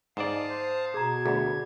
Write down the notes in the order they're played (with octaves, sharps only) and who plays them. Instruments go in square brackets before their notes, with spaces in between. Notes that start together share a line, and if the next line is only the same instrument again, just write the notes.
[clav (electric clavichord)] G#2 D5 [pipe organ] F5 A5 D#6 [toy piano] D6
[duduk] C5
[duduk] B2 [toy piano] G#4 A#5 [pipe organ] G#6
[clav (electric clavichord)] D2 [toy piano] G#4 B5